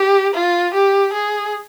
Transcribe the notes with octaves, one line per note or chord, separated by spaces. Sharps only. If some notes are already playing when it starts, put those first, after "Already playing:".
Already playing: G4
F4
G4
G#4